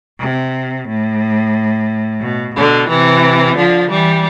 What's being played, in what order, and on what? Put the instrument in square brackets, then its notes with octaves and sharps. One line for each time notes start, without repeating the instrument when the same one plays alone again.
[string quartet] C3
A2
B2
B2 D3
C3 E3
D3 F3
E3 G3